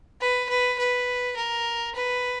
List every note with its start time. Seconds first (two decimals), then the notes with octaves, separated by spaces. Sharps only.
0.21 B4
0.49 B4
0.79 B4
1.36 A#4
1.96 B4